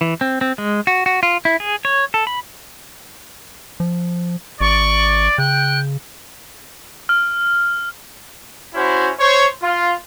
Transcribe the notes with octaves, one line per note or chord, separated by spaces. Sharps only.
E3
C4
C4
G#3
F#4
F#4
F4
E4
G#4
C#5
A4
B5
F3
G#1 D5 C#6
C#3 G5 F#6
F6
C#4 E4 F#4 C5
C5 C#5
F4